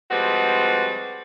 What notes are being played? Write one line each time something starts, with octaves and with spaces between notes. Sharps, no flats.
F3 G3 G#3 C4 F#4 B4